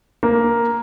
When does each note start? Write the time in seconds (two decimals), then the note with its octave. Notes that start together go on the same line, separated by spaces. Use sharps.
0.23 A#3